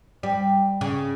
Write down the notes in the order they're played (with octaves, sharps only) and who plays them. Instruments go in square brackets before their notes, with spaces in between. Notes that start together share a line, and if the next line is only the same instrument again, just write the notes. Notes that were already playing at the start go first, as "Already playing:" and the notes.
[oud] G3
C#3